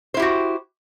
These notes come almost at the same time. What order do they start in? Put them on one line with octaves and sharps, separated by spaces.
C5 E4 G4 F#4